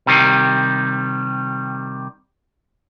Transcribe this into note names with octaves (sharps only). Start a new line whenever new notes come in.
C3 D#3 G3